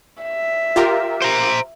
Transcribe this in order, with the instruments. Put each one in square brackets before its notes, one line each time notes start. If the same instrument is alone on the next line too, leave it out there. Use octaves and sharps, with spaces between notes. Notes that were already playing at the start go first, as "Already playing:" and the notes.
[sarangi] E5
[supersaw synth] F4 G4 A#4
[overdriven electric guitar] C5 A#5